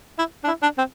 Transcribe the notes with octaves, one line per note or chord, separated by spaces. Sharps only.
E4
D4
E4
D4
C4